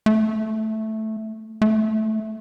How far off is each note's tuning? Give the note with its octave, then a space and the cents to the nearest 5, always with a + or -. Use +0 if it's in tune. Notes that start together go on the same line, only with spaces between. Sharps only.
A3 -5
A3 -10